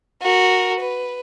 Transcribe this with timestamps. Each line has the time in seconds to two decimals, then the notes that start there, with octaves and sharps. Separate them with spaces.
0.23 F#4 A#4
0.80 B4